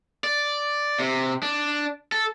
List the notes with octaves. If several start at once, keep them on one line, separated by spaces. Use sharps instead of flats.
D5
C3
D4
A4